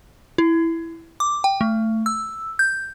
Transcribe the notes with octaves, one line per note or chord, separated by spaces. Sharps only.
E4
D6
G5
A3
E6
G6